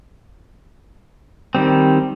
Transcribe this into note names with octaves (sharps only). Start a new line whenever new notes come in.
D#3 G3 C4